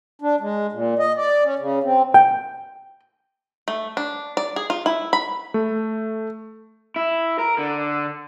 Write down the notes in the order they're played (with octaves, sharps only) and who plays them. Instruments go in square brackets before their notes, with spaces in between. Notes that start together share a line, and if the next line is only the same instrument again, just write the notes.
[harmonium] D4
G#3
A#2
D#5
D5
C#4
C#3
C4
[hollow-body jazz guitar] G5
[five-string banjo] A3
D4
D5
G#4
F4
E4
B5
[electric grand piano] A3
[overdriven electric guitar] E4
A#4
D3